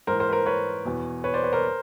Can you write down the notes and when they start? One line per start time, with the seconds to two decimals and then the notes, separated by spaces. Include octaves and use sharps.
0.07 G#2 E3 A#4 C5
0.20 A#4 C5
0.29 B4
0.33 A#4 C5
0.46 B4 C#5
0.85 E2 B2
1.24 B4 C#5
1.34 C5 D5
1.44 B4 C#5
1.53 A#4 C5